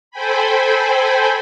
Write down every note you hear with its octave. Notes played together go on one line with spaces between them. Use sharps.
A4 C5 G5 G#5 B5